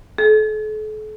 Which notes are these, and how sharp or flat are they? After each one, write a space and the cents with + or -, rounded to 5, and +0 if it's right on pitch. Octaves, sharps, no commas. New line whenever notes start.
A4 -40